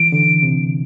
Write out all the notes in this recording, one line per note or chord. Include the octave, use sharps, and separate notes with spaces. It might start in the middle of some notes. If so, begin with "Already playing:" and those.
Already playing: E3 D7
D3
C3